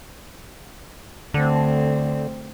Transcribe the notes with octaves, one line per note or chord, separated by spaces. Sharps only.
D2 D3 C4